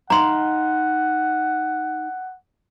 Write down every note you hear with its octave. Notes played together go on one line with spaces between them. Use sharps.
D#4 D#5 F5 F#5 A#5 C6